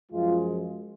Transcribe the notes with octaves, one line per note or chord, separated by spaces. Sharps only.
F#2 F3 G#3 F4